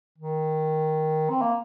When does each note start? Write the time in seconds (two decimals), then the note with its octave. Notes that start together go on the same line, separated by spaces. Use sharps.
0.18 D#3
1.30 C4
1.41 A#3